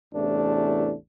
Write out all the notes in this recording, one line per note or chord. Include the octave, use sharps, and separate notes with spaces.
A1 E2 C3 A3 D4